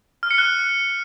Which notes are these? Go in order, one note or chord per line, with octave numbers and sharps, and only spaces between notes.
F6
C#7
F#6